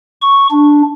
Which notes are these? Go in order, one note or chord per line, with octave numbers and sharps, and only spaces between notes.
C#6
D4